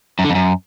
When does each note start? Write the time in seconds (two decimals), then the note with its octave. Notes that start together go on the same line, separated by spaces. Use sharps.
0.19 F#2
0.24 D3
0.30 F2
0.35 F#2